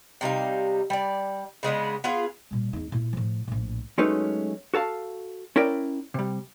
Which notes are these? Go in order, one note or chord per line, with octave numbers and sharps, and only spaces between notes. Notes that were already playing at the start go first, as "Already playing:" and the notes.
C3 G3 D#4 F5
G3 D5
C#3 G#3 B3 D4
B3 F4 G#4 F5
A#2 G3
E2 D#4
A#2 E4
A2 F3
A#1 A2
F#3 G#3 A3 C#4 D#4 B4
F#4 A4 F5 A5
C#4 E4 A#4 D5 G5
C3 G3